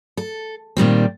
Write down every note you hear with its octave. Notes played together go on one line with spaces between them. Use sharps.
A4
A#2 D#3 G3 C4